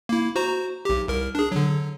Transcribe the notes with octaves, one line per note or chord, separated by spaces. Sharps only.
A#3 E4
F#4 C5 A#5
B1 G4
C2 A#4
D4 G#4
D3 F#3